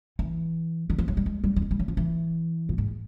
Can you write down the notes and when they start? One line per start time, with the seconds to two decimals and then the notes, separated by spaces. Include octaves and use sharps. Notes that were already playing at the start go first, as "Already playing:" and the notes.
0.19 E3
0.90 D#3
0.98 F3
1.08 F#3
1.17 G3
1.26 G#3
1.44 G3
1.56 G3
1.62 G#3
1.71 G3
1.79 F#3
1.88 F3
1.97 E3
2.69 A#2
2.78 G#2